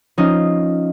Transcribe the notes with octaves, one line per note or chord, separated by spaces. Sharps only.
F3 C#4 D#4 F4